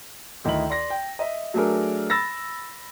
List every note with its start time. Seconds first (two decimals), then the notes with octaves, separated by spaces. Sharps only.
0.44 D2 D#3 E4 E5 F#7
0.69 D5 C6 A#6
0.90 G5
1.19 D#5 E5
1.54 F#3 A3 D4 G#4 A#4
2.10 B5 E6 A6 A#6